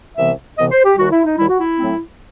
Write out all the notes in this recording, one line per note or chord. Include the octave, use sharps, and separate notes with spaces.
C2 C3 E3 B3 E5
C2 C3 E3 B3 D#5
C5
G4
D#2 D#3 G3 F#4
E4
D#4
D#2 D#3 G3 E4
F#4
E4
A2 F#3 A3 C4